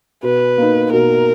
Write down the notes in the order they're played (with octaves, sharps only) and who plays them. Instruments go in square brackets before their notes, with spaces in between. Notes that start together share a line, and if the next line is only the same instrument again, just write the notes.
[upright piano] B2 [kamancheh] B4
[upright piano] A#3 D#4
[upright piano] B2 [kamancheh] A#4